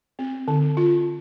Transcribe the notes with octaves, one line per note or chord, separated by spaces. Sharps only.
C4
D3
F4